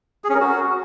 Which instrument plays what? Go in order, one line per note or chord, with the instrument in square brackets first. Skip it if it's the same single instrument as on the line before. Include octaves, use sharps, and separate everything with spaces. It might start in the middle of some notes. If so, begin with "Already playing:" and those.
[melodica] G#4
C#4
A#4
F#4